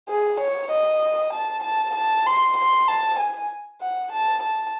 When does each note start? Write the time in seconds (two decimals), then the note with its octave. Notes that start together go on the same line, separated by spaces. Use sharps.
0.09 G#4
0.40 C#5
0.71 D#5
1.33 A5
1.64 A5
1.95 A5
2.26 C6
2.57 C6
2.88 A5
3.20 G#5
3.81 F#5
4.12 A5
4.43 A5